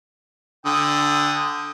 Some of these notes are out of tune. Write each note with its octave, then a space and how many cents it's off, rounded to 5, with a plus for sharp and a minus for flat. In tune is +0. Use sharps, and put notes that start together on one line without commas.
D3 +0 G5 +25 D#6 +0